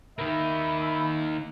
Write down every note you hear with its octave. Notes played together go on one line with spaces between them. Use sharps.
A#3 D#4 E5 B5